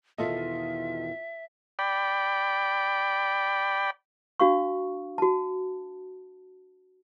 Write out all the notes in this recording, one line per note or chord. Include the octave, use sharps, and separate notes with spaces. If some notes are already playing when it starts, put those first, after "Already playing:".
E2 B2 D#3 F4 A4 D#5 E5
D5 G5 B5
D4 F#4 F5 C#6
F#4 A5